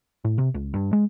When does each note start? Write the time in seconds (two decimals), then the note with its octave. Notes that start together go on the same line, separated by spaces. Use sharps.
0.25 A2
0.38 C3
0.54 C#2
0.74 G2
0.93 G#3